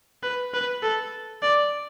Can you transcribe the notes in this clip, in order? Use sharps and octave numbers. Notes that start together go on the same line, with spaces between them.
B4
B4
A4
D5